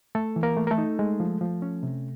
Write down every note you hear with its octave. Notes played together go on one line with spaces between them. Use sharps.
A3 A4
E3
A#3 A#4
A3
A#4
A3 A4
D#4
G#3
F3
F3
C#4
C3